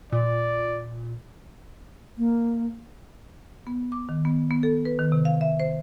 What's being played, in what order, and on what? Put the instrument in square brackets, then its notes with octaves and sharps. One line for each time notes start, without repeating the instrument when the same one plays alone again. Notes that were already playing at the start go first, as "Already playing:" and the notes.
[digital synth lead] A#2 [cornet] D5
[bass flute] A#3
[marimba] B3
D6
D#3
B3
B3
A4
B4
D#3
C3
F5
E5
C5